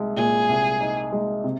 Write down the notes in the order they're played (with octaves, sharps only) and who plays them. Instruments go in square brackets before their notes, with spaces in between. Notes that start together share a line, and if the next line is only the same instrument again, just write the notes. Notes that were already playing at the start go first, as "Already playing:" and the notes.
Already playing: [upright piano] C2 G#3 D#4
[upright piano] A#2 [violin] G#4
[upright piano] C2
D#4
G#3
C3